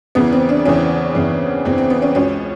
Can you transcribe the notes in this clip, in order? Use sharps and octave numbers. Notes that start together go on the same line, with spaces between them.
E2 C#3 E3 B3
C4
D4
E2 C#3 E3 C#4
E2 C#3 E3
E2 C#3 E3 C4
C4
B3
C#4
C#2 B2 C#4